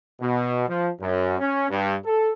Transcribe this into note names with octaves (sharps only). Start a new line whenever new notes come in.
B2
F3
F#2
C#4
G2
A4